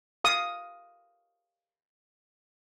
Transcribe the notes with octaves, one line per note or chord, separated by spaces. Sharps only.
F5 D#6